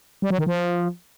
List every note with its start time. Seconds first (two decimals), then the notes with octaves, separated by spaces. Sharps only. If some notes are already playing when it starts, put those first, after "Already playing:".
0.22 G3
0.30 F#3
0.38 D#3
0.47 F3